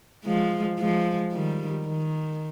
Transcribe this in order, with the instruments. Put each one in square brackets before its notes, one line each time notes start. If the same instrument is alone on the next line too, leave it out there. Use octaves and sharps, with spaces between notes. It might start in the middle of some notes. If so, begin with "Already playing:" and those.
[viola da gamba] F3 G#3
F3 G#3
D#3 G3
D#3